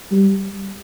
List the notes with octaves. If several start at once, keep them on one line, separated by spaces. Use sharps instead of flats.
G3